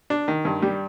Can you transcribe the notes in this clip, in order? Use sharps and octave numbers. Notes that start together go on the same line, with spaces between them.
D4
D#3
G2
G3